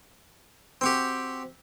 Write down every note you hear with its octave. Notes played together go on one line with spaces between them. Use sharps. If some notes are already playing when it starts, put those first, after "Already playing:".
C4 F#4 G4